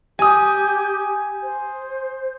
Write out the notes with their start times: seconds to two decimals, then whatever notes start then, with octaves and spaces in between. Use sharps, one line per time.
0.19 G4 G#5 D#6
1.43 C5